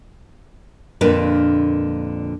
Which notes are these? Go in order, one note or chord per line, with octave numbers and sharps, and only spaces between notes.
F2 A#2 D3 A#3 D4 B4